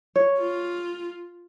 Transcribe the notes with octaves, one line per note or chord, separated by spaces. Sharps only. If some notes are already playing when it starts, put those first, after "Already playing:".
C#5
F4